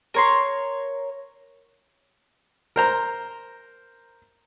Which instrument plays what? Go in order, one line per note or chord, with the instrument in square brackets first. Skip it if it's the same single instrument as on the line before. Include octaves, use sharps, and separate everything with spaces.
[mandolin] A#4 C#5 C6
[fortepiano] A#4 C5 A#5